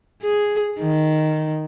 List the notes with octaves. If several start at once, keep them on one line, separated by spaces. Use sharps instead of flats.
G#4
D#3